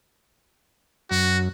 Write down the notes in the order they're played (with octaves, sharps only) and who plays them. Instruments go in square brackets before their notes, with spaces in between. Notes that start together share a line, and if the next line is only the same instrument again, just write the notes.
[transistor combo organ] F#2 [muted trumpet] F#4